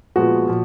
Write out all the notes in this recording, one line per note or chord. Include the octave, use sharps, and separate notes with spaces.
A#2 F3 G#3 B3 F#4
A#2 F3